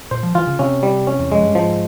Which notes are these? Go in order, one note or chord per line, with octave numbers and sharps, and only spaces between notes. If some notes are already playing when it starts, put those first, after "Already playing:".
A#2 C5
F3
E3 F4
C#3
C3 C#4
G3
C#4
E2
F2 G#3
G2
G#2 F3